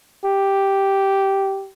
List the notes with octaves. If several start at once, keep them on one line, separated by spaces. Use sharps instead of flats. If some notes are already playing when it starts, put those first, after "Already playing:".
G4